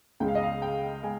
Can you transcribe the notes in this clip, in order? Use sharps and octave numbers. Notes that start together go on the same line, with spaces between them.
C#2 C#3 G#3 G5
F5
D#5
F5
G5
G#3 G#5